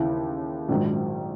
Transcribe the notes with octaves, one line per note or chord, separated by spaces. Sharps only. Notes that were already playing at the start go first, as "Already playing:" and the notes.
Already playing: D#2 C#3 E3 E4
A#1 G#2 D#3 F#3